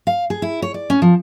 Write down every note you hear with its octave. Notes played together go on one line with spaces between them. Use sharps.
F5
G#4
E4
C#5
D5
C#4
F3